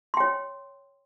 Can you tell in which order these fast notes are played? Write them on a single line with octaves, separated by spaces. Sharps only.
C6 G5 C#5